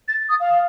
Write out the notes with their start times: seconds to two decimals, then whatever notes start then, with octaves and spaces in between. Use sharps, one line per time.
0.08 A6
0.29 D#6
0.40 F5